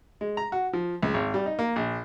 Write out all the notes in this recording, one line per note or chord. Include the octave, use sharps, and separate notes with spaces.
G#3
A#5
F#4
F3
C#2
G#1
G3
D#4
A#3
A#1